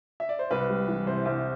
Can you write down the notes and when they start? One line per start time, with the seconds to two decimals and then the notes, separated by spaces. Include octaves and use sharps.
0.20 E5
0.29 D5
0.39 C5
0.51 C2 B4
0.70 G3
0.87 E3
1.06 C3 C5
1.25 C2